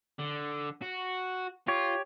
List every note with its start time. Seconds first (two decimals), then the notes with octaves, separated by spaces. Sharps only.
0.19 D3
0.82 F#4
1.68 F4 G4 C#5